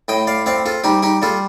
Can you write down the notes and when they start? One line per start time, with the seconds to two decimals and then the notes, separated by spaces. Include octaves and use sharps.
0.08 A2 D#5 G5
0.27 D5 F5
0.46 C4 D5 F5
0.66 F4 A4
0.84 G3 D#4 G4
1.03 D#4 G4
1.22 G3 F4 A4